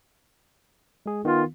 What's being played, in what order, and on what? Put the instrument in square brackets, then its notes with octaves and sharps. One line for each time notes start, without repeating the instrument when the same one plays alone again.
[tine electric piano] G#3 G#4
[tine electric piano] D#3 B3 [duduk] F4